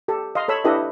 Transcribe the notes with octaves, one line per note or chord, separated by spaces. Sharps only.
G4 A4
D#5 F5 C6
A4 C#5 B5 E6
D4 E4 G4 A4 B4 D#5